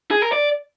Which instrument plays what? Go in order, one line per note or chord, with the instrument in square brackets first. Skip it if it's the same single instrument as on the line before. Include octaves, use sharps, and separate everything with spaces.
[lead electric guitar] G#4
A#4
D5